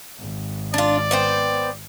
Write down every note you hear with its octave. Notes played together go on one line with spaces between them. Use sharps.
G#1
D4 F4 D5
B3 C5 G5